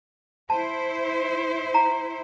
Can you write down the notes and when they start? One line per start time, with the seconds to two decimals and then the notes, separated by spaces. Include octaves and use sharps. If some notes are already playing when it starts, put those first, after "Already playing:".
0.50 E4 C5 A5
1.74 A#5